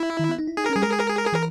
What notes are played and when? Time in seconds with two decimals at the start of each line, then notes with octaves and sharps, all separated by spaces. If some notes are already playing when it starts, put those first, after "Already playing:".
Already playing: E4
0.19 D#3
0.29 B3
0.39 D#4
0.47 E4
0.57 D#4 G#4
0.66 A#4
0.70 C#4
0.75 G3 G#4
0.83 G#3 A#4
0.92 G#4
1.00 A#4
1.09 G#4
1.18 A#4
1.27 G#4
1.33 E3 A#4